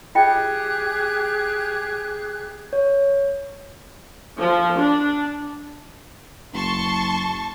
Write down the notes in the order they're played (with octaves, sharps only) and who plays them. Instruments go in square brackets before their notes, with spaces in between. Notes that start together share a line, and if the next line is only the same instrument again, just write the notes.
[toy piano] F4 D#5 G5 [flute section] G4 G#4 F#6
[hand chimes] C#5
[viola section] F3
D4
[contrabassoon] F#1 [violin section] A5 C6 C#6